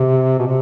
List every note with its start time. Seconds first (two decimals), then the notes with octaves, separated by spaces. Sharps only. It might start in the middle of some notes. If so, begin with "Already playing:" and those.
Already playing: C3
0.39 B2
0.47 C3